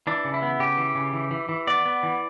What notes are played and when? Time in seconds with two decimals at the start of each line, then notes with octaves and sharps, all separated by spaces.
0.07 E3 D4
0.25 C#3
0.34 E4
0.42 B3
0.59 C#3 G4
0.77 E3
0.95 C#3
1.14 E3
1.31 E3
1.49 E3
1.67 B3 D5
1.86 B3
2.03 E3